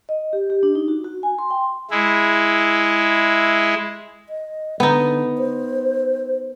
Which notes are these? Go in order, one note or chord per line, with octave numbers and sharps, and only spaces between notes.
D#5
G4
G4
D4
D#4
F#4
F#4
G#5
C6
G5
G#3 E4
D#5
D3 B3 D#4
C5